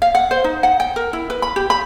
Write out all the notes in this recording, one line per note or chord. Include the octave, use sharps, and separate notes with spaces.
F5
F#5
C5
D#4
F#5
G5
A#4
E4
B4
B5
G4
B5